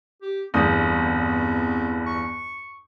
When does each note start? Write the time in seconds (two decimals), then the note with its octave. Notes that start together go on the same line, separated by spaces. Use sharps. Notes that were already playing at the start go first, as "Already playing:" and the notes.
0.22 G4
0.54 G1 E2 C4 D#6 G6
2.06 C#6